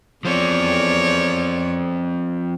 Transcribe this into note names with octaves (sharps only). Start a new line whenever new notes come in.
E2 F3 C4 C#5 D5